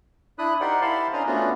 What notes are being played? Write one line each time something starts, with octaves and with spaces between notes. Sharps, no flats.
D4 E4 B5 D#6 F#6
D#4 G4 A#4 C5 D5 F#5
E4 C5 F5 A5 B5 C6
C#4 D4 A#4 C5 D#5 A#5
A3 B3 C#4 D4 F4 F#4